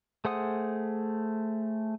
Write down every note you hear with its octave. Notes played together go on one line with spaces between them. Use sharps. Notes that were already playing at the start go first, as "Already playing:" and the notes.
A3 G#4 C5 F#5 D#6